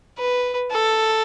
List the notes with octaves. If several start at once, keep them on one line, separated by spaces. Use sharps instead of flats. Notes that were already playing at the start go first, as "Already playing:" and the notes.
B4
A4